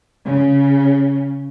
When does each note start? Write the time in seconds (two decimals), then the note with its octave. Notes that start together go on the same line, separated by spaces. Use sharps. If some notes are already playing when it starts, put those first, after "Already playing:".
0.25 C#3